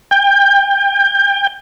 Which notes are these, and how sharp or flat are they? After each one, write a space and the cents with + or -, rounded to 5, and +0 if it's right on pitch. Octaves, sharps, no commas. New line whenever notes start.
G5 +30